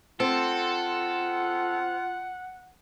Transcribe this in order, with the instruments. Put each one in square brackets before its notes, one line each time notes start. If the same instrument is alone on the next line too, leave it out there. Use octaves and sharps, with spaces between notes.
[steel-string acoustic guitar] C4 [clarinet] F4 [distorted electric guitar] A4 [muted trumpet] F#5